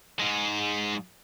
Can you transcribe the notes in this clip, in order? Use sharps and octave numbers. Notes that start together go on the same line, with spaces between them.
G#2 G#3